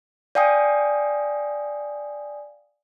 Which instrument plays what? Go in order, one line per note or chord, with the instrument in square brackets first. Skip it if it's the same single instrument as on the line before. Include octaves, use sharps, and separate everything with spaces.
[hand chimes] D5 F5 G5 G#5 D#6